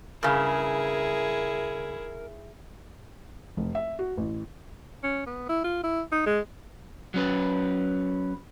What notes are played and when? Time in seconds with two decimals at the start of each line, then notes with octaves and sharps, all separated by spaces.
0.23 G2 C#3 E4 G#4 A#4
3.57 F1
3.75 E5
3.99 F#4
4.17 A1
5.04 C#4
5.27 B3
5.49 E4
5.64 F4
5.84 E4
6.12 D#4
6.26 G#3
7.14 F#3 C#4 B4